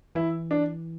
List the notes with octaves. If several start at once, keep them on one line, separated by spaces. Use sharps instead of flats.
E3 E4
D4